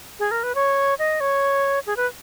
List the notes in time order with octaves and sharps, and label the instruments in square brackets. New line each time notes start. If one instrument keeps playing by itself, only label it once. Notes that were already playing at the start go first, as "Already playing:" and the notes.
[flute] G#4
A#4
B4
C#5
D#5
C#5
G#4
B4